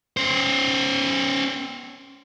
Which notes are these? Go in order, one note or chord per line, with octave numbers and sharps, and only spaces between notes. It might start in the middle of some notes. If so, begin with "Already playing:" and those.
C#4 C5